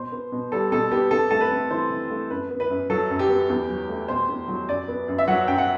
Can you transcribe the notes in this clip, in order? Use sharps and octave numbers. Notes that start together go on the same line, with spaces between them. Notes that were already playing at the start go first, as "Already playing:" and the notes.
Already playing: B2 C5
B3
B2
G3 A4
B2 A4
B3 G4
C3 A4
A3 A4
B4
C4
E3 C5
C3
A3
F#2 B4
B3
B4
F#2
F#3 A4
F#2
G4
B3
E2
F#3
A3
B2 C5
E2
F#3
F#2 D5
B3
F#2
E5
F#3 F#5
F#2 G5
F#5